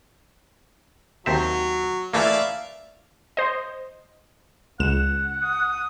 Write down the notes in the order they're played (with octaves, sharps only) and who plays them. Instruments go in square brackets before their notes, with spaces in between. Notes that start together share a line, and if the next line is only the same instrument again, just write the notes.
[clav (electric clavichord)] D#2 C4 E5 [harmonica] F#3
[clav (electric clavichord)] E3 A3 A#3 [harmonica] D5 E5 F5
[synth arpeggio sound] C5 D#5
[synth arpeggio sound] C#2 E7 [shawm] F#5
[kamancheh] D#6